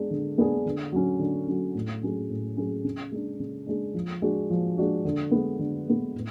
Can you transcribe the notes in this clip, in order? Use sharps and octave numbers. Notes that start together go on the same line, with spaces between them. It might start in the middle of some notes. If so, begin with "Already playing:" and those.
Already playing: G#3 B3 D4 G#4
D3
G#3 B3 D4 G#4
D3
F#3 C#4
D3
F#3 C#4
A2
F#3 C#4 G#4
A2
F#3 C#4 G#4
C#3
G#3 D4
C#3
G#3 D4
F3
G#3 D4 F#4
F3
G#3 D4 F#4
D3
G#3 B3
D3
G#3 B3
A2